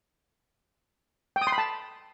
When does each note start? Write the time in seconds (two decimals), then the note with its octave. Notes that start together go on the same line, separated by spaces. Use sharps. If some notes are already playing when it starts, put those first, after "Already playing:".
1.36 G5
1.42 D#6
1.47 C6
1.52 B5
1.58 A5